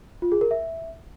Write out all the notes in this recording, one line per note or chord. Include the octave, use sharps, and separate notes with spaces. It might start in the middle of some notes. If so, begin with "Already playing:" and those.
F4
G#4
A#4
E5